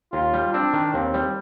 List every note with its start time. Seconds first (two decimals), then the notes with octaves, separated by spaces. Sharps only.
0.13 D#2 F4
0.33 G3
0.53 C4 D4
0.73 D#3
0.93 D#2 C4
1.14 G3